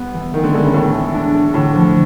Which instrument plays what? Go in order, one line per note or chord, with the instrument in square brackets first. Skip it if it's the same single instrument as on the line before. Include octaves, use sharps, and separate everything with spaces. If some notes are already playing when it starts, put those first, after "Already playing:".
Already playing: [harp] G3 B3
E3
[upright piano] D#3 [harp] E3
[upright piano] D3
[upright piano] D3 [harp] G#3
[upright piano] C#3
[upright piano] A2 [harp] A3
[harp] A3
D4
A3
[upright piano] A2 [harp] D3
[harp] F3